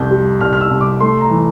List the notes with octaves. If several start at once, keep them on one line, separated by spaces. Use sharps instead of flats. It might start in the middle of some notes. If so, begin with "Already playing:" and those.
Already playing: C2 F2 G6
G3
C2 F6
F6
E6
C2
D6
A3 C6
A#5
E3